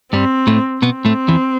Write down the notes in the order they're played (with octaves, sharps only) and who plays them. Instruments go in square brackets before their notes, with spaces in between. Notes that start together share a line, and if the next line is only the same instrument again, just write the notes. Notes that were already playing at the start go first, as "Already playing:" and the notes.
[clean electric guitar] G2 G3 [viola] C4
[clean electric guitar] A2 A3
[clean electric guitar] B2 B3 [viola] C4
[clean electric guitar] A2 A3
E2 E3